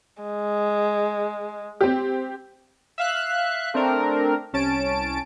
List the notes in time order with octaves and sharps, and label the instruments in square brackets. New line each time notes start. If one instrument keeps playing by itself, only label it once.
[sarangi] G#3
[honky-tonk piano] C4 G4
[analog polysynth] E5 F5 F#6
A3 C4 D4 A#4
C2 C#4 A5 D7